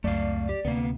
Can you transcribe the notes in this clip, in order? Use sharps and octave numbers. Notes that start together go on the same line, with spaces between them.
C#2 F#2 A3 D5 F5
G4
D2 C3 A#3 B3